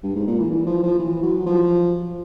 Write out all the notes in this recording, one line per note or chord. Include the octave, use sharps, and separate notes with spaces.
G2
G#2
A#2
E3
E3
F3
F3
E3
F#3
F3